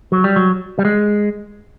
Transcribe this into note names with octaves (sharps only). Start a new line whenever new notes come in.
F#3
G3
F#3
G3
G#3